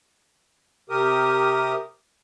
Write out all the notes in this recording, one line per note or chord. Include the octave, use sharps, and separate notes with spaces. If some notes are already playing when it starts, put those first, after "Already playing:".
C3 G4 A#4 D#6